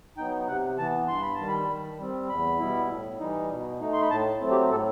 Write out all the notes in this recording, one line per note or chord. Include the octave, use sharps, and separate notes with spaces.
F#3 B3 D#4 G5
C3 F#5
E3 B3 A5
G2 C6
B5
D#3 G3 A5
B5
D#3
G3 C4
E2 B5
B2 G3 B3 E4
A2
E3 G3 D#4
B2
A3 D#4
C6
B5
A2 A5
F#3 A3 C4
G4
A2 A4